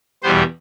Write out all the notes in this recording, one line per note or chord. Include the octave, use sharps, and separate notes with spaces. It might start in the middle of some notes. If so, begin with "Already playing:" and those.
E2 B2 G3 B3 C5